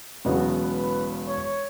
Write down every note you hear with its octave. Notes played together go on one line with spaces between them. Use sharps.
E1 E2 C#3 F#3 B3 F#4
B4
C#5